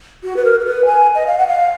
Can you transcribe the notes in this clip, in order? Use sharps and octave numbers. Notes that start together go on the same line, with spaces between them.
F#4
B4
A#4
A#4
B4
G#5
D#5
F5
F#5
F5